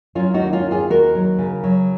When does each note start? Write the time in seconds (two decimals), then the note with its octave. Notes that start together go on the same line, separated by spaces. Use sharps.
0.15 F#3 C#4 F4
0.34 D#4 F#4
0.40 D#2
0.53 C#4 F4
0.65 D#2
0.71 F4 G#4
0.89 D#2 F#4 A#4
1.15 F#3
1.38 C#3
1.64 F#3